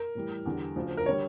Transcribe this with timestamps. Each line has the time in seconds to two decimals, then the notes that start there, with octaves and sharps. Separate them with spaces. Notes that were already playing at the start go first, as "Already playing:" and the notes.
Already playing: A#4
0.15 A2 E3 G3
0.46 E2 D3 G3
0.76 D2 C#3 F3
0.97 A#4
1.06 D3 G3 C#5